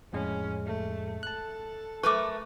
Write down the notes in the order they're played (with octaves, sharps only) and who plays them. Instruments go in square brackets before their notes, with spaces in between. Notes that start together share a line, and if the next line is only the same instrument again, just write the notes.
[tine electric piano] F2 A2 G#3 [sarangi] C#4
[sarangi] A3
[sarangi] A4 [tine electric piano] A5 F#6
[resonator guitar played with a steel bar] A3 A#4 B4 [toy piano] C#6 D6